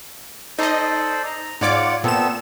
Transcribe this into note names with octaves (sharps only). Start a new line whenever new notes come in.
D#4 A4 C5 D5 D#5
A#5
G#2 F4 C#5 D5 F#5 D6
A#2 B3 C4 A4 E7